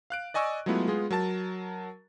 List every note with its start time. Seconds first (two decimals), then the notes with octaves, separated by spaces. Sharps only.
0.10 F5 F#6 D7
0.34 D5 D#5 G#5 C#6 E6
0.66 F#3 G#3 A3 B3 E4 F4
0.88 G#3 B3 F4 G#4
1.11 F#3 A#4 A5 A6